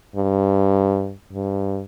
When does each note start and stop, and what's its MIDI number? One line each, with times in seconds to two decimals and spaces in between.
0.16 1.13 43
1.33 1.82 43